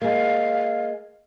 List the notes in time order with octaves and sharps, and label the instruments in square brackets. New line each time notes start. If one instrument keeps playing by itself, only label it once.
[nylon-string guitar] G#3 A#3 [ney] F5